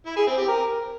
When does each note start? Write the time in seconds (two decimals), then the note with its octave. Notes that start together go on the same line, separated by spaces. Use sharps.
0.06 E4
0.16 G#4
0.27 C4
0.37 G4
0.48 A#4